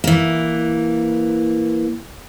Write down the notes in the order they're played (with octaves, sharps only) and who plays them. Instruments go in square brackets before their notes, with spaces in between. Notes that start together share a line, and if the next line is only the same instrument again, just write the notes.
[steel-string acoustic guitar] E3 A#3